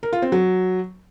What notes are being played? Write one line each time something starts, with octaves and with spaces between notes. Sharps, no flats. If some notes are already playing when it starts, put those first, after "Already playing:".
A#4
F4
C4
F#3